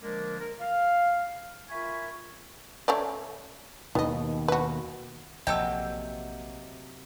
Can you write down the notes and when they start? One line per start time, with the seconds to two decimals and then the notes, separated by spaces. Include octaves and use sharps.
0.01 D3 F3 G#3 A#3 D4 A#4
0.39 A#4
0.59 F5
1.70 F4 A#4 E5 G#5 B5 C#6
2.88 A3 C#4 D5
3.95 D#2 B2 D#3 B3 D#5
4.48 F#4 B4
5.47 A#1 C3 F#3 A3 A4 D#5 G5 E6